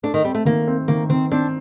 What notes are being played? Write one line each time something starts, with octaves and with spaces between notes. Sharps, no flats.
A3 D4
D#3
G3 C4
A3
D#3 A#3
C4
D#3 A#3
D#3 C4
C4 D4